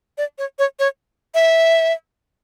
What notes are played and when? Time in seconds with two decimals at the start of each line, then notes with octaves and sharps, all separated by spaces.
0.18 D5
0.38 C#5
0.59 C#5
0.79 C#5
1.34 E5